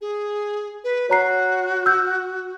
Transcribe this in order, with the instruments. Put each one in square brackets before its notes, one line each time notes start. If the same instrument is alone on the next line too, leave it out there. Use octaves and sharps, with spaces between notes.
[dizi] G#4
B4
[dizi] F#4 [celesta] C#5 A#5 C7
[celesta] E6 G6